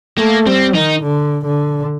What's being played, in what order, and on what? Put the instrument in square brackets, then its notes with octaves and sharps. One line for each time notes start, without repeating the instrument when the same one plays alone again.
[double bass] A3 [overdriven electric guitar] A#3
[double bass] G3 [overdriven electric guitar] C4
[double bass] D#3 [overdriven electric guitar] D#4
[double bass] D3
D3